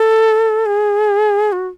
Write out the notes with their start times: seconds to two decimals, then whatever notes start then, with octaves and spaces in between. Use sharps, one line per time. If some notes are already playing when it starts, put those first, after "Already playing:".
Already playing: A4
0.66 G#4
1.52 F#4